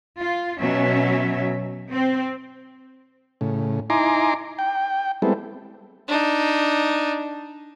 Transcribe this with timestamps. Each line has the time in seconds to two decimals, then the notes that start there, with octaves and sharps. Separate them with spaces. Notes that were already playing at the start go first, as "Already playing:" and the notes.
0.20 F4
0.61 B2 F#3 C#4 E5
1.90 C4
3.41 A2 C#3
3.90 D#4 E4 G#5 A#5 C6 D6
4.59 G5
5.22 G3 G#3 B3 C4 E4 A4
6.08 D4 D#4